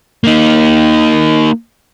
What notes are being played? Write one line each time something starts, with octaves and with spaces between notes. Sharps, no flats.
A#3 D#4